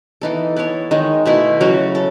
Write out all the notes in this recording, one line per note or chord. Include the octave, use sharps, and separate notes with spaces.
E3 B3 D#4 A4
B3 E4 A4 C#5
D#3 G#3 D#4
B2 A3 E4
C#3 F#3 C#4 F#4
A4